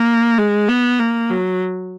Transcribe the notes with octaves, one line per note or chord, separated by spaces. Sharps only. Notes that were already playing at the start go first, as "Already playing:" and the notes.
Already playing: A#3
G#3
B3
A#3
F#3